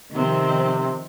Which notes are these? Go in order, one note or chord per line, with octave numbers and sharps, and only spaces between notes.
C3 D#3 F3 C4